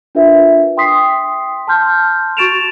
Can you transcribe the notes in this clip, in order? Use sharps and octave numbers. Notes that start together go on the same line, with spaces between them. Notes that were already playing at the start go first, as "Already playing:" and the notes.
D4 F4 A#4 B4 E5
G5 C6 D#6 B6 C7
A5 C6 F6 G6
F#4 C#6 A6 D7 E7 F7